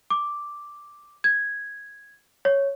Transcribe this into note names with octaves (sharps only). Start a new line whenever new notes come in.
D6
G#6
C#5